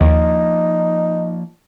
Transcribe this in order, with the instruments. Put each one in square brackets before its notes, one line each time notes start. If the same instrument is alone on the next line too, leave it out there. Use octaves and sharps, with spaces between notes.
[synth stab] D#2 [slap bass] F3 A#3 [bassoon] D#4